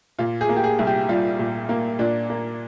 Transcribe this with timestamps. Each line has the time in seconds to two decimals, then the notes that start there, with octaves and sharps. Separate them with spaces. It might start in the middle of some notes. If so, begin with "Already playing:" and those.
0.19 A#2 F4
0.41 G#4
0.49 A#3
0.56 G4
0.64 G#4
0.79 C2
0.87 G4
1.09 G3 F4
1.39 A#2
1.69 A#3
1.99 A#2 D4
2.30 A#3